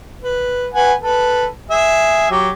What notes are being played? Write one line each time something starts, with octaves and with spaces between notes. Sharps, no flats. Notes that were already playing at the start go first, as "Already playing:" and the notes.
B4
B4 F#5 G#5
A4 B4
G#4 E5
F#3 G4